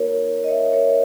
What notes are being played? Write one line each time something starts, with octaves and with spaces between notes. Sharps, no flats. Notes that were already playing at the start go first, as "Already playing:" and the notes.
Already playing: A#3 D#4 F#4 A#4 C#5
D#5
C#5 E5
A#4 C#5